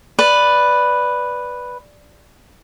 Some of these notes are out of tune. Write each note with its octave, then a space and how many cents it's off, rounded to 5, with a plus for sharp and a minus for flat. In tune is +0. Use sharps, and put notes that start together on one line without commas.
B4 +0 D5 +0